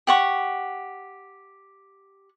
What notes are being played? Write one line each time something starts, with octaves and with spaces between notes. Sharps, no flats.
G4 F#5 C#6